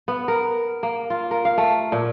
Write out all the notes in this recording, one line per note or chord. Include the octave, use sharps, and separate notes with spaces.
B3
A#4
A#3
F4
A#4
F5
A3
A#2